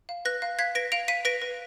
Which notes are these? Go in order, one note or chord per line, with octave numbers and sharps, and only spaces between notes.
F5
B4 F#6 A#6
F5
F5 G#6 B6
B4 A#6 D7
F5 D7 F7
F5 B6 D#7
B4 A#6 D7
B4